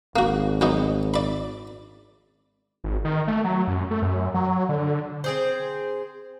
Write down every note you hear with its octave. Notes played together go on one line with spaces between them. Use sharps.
G#1 A#3 F#4
F#3 B3 D#4
D5 B5
G#1
D#3
A3
F#3
F#2
A3
F#2
F#3
D3
C4 G#4 C5